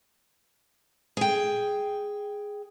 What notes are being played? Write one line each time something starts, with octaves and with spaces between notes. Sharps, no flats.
G#4 G5